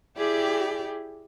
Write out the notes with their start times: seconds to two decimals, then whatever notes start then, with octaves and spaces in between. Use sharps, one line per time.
0.17 E4 G4 G#4 D5 G5